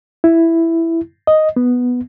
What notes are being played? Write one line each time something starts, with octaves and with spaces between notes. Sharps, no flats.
E4
D#5
B3